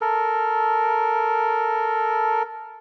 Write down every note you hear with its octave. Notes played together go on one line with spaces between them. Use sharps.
A4 A#4